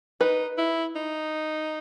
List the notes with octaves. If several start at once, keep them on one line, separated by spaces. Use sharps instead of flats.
D#4 B4
E4
D#4